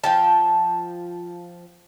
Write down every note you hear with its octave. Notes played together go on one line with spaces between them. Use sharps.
F3 G5 A5